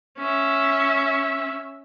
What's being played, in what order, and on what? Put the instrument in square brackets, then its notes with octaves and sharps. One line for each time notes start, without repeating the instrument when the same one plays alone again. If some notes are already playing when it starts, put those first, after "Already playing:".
[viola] C#4 E5